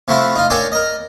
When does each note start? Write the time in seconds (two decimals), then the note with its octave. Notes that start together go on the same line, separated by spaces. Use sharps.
0.08 C3 F3 A3 E4 F#4
0.36 D#4 F4
0.50 D4 A4 A#4 C#5 G5 G#5
0.72 A#4 D#5